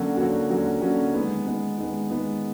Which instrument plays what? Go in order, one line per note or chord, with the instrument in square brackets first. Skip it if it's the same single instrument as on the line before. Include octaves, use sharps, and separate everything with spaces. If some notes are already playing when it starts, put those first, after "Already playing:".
Already playing: [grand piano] D3 F#3 A#3 C#4 F#4
D3 F#3 A#3 C#4 F#4
D3 F#3 A#3 C#4 F#4
D3 F#3 A#3 C#4 F#4
D#3 G#3 B3
D#3 G#3 B3
D#3 G#3 B3
D#3 G#3 B3